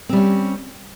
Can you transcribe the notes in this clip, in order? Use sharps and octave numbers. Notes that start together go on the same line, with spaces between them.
G3 C4 C#4